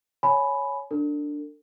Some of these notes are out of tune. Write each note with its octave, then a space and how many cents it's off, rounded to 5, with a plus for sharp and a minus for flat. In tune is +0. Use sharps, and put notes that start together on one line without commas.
C#5 +0 G#5 +20 B5 +0
D4 +0 A4 +45